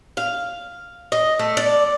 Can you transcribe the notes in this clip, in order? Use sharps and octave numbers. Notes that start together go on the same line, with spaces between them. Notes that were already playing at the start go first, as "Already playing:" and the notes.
F5
D#5
A3
D5